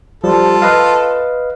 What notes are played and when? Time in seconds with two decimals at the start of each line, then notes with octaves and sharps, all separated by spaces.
0.24 F3 G3 F4 A4
0.62 B4 D#5 F5